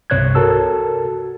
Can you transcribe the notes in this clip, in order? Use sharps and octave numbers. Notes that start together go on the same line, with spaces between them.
C2 G2 C3 C#5 F#6 G#6
F#4 A4 A#4 A5 E6